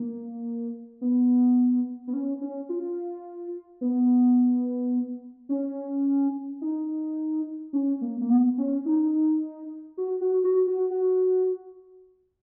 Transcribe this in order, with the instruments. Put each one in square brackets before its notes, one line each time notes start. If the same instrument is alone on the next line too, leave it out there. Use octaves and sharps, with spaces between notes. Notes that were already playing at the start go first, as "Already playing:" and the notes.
Already playing: [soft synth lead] A#3
B3
B3
C#4
C#4
F4
B3
C#4
D#4
C#4
A#3
A#3
B3
C#4
D#4
F#4
F#4
F#4
F#4
F#4